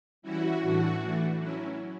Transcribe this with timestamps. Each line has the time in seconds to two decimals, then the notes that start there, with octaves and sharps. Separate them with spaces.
0.22 E3 G3 C#4 E4 F#4
0.61 A2 E3 A3 D4 F#4
1.00 E3 A3 D4
1.38 F#3 C#4 E4